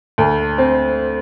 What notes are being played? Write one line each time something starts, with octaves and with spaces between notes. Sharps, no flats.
D2
C4